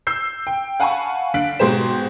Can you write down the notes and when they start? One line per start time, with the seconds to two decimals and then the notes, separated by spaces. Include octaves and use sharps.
0.07 E6 G6 C7
0.47 G5
0.80 F5 F#5 G#5 A5 B5 C#6
1.34 D3 F5 F#6 B6 D7 F#7
1.59 G#2 B2 G4 G#4 C5 E7